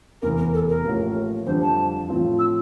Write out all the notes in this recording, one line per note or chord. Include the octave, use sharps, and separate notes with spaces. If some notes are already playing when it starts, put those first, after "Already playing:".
F1 E2 E3 A#4
A#4
A4
A#4
A1 A2 F3 A#3
F2 D3 G3 C5
A5
A2 F3 C4 F4
E6